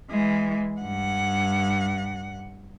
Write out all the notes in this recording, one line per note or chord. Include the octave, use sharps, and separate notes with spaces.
E3 G#3
G2 F#5